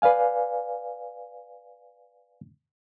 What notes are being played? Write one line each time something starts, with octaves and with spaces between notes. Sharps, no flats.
B4 D5 F5 G#5